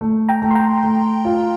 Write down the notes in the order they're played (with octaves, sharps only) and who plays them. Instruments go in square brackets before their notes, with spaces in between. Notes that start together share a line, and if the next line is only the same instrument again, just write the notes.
[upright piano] A3
[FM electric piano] G5 A#5
[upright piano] A3
[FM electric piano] C6
G5 A#5
[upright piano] A3
F4